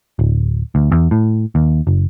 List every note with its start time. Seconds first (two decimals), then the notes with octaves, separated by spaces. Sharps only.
0.19 D1
0.75 D2
0.92 E2
1.11 A2
1.55 D#2
1.87 F#1